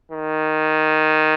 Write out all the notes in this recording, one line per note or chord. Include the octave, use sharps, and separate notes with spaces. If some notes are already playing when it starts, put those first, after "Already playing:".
D#3